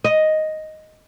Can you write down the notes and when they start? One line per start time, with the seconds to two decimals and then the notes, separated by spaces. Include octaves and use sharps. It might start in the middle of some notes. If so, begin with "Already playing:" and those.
0.04 D#5